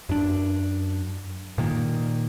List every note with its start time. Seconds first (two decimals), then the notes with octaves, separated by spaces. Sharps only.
0.09 F#2 D4
1.58 A#2 D#3 A#3